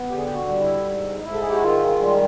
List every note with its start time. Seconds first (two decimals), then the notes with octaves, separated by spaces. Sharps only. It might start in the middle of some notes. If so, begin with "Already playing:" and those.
Already playing: B3
0.08 D3 G4
0.16 G#4
0.24 G4
0.34 F#4
0.47 G3
0.60 E4
0.85 G#2
1.18 D#4
1.23 G#2 E4
1.33 A4
1.41 G#4
1.48 G4
1.55 F#4
1.62 D#3 F4
1.87 F4
2.00 G3 F4